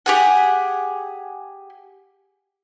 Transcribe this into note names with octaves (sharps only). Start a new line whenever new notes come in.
G4 G#4 F#5